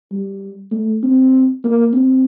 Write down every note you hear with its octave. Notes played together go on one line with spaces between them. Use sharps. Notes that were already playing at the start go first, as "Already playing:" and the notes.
G3
A3
C4
A#3
C4